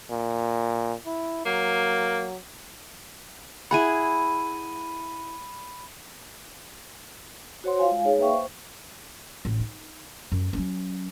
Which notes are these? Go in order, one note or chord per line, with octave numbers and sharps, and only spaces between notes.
A#2
E4
F#3 A#3
E4 G#4 F#5 B5 D#7
F#4 C5 C#5 F#5 C6
F4 F5 G#5
G#3 F5 G#5
D#4 G#4 C#5
A#3 B4 E5 F5 G5 C#6
C5
A1
D#4
F#2
F#3 C#4